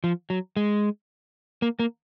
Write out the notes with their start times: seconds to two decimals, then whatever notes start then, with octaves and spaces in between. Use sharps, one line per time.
0.04 F3
0.30 F#3
0.57 G#3
1.62 A#3
1.79 A#3